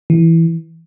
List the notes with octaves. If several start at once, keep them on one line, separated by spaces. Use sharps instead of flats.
E3